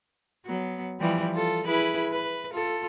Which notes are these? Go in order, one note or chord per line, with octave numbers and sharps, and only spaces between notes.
F#3 B3
E3 F3 G3
F4 A4
E4 G#4 B4
B4
F4 A4